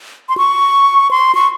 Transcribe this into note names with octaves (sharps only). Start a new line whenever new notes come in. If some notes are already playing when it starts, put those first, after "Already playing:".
C6
C#6
C6
C#6